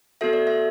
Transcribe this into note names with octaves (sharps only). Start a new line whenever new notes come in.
B3 F#4 A4 E5
D5
E5